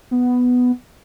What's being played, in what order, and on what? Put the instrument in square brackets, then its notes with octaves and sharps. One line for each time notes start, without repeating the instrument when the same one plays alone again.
[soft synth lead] B3